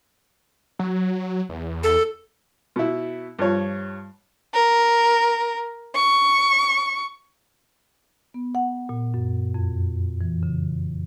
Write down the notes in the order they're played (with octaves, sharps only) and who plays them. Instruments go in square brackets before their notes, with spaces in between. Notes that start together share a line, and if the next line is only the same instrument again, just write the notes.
[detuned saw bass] F#3
E2
[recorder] A4
[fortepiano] B2 E4
G2 F3 C#5
[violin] A#4
C#6
[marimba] B3
F#5
A#2
F#2
F2
E3
C#3